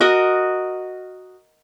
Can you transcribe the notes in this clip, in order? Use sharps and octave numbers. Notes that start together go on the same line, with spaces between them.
F#4 A#4 D#5